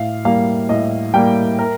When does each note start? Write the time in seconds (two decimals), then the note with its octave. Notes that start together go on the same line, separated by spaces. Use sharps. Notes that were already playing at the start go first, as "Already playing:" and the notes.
Already playing: A2 F5
0.25 G3 A#3 F5
0.69 A2 D#5
1.14 G3 A#3 G5
1.59 A#4